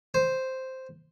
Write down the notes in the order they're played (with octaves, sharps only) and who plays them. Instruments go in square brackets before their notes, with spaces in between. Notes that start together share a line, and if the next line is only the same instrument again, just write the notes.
[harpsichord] C5